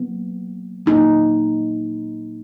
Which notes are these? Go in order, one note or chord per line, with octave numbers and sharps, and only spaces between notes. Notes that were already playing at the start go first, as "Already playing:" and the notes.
Already playing: B2 F#3 A#3 B3
A#2 F#3 A#3 D#4